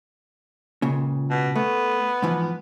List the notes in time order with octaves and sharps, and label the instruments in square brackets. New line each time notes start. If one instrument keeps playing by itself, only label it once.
[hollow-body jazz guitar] C#2 A#2 C#3
[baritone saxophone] B2
[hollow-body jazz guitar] A3 [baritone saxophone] B3
[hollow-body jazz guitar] G#2 E3 F3